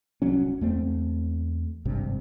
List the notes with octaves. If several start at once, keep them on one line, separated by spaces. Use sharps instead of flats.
D1 C2 F#3 C#4
E2 A3 C4
G#1 G2 C3